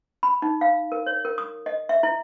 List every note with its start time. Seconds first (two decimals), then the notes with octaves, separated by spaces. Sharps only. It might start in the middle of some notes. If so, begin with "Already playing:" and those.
0.23 B5
0.42 D#4
0.61 F5
0.92 A#4
1.06 C#5
1.25 A#4
1.38 D#6
1.66 D#5
1.89 E5
2.03 E4